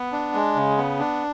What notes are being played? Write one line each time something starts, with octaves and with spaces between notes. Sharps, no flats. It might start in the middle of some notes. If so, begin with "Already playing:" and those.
Already playing: B3
D4
G#3
C#3
B3
D4